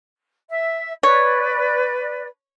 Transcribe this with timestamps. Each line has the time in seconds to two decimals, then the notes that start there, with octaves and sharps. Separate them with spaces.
0.50 E5
1.03 B4 C#5 D5